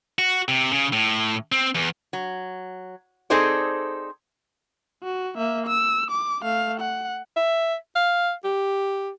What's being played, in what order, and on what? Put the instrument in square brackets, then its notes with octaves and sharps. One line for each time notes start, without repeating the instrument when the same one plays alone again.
[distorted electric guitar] F#4
C3
C#3
A2
C4
E2
[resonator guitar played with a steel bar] F#3
C4 D#4 G#4 A4 C5 D5
[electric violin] F#4
A#3 E5
E6
D6
A3 F5
F#5
[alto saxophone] E5
F5
G4